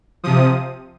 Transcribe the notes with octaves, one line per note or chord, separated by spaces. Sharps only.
C3 F3 D#6